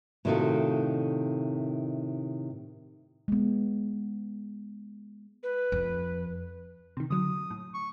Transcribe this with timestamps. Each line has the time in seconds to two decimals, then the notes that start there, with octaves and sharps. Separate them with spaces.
0.25 A2 C3 D#3 F4 F#4 A4
3.28 G#3 B3
5.43 B4
5.72 F2
6.97 C3 D#3
7.10 D3 F#3 D#6
7.50 A2
7.74 C#6